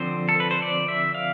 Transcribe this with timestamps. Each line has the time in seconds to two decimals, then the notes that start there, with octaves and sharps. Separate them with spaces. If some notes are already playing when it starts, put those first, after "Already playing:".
Already playing: D3 F3 C4 C5
0.29 A4
0.40 B4
0.51 C5
0.62 D5
0.88 E5
1.14 F5